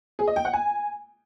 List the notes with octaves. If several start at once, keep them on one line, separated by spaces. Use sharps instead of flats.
G#4
D#5
G5
F#5
G#5